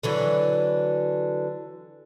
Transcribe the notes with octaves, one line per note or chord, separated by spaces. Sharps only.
D3 E3 F#3